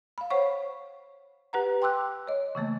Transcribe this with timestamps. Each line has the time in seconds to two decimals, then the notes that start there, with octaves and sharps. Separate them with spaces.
0.18 F5 B5
0.30 C5 C#5 F#5 C#6
1.53 G4 B4 F#5 A#5
1.82 G5 C6 D6 E6 F#6
2.27 C#5 D#5
2.55 C#3 E3 A3 A#3